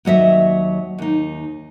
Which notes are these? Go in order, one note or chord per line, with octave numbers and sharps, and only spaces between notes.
D#2 F#3 D#5 E5
D#2 D#4